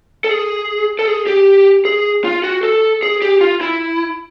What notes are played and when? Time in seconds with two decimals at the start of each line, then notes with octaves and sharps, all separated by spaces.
0.24 A4
0.29 G#4
0.99 A4
1.08 G#4
1.27 G4
1.85 G#4
2.24 F4
2.44 F#4
2.63 A4
3.03 G#4
3.22 G4
3.41 F4
3.61 E4